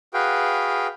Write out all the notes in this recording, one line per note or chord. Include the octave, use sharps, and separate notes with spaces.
F#4 G#4 B4 F5 G5